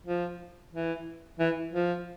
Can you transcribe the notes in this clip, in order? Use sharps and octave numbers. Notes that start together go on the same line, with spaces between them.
F3
E3
E3
F3